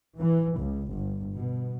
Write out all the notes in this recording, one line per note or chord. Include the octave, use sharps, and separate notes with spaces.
E3
C#2
G1
B2